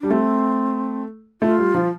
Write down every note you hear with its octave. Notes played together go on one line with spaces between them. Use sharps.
G3 D4
A3 C4
A3 F4
G3
F3